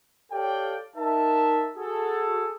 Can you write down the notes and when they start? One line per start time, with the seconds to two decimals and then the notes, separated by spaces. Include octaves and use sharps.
0.32 G4 A4 C#5 D5 F5 G5
0.96 D#4 A#4 E5 A5
1.77 F#4 G#4 A4